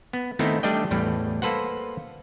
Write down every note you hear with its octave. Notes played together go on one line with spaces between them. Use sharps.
B3
D#3 A3 B3 C4 D#4 E4
G3 A3 D4 D5 D#5 G5
E2 A2 G3 B4
A#3 A4 B4 C5 F#5